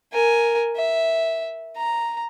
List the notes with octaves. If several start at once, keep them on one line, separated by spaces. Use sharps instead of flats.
A#4 G#5
E5
A#5